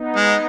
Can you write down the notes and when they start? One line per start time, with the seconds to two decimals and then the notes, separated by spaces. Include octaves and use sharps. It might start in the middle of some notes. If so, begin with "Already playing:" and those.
Already playing: B3 D#4
0.16 G#3